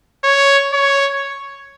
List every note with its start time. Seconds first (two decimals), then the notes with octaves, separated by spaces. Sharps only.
0.24 C#5
0.73 C#5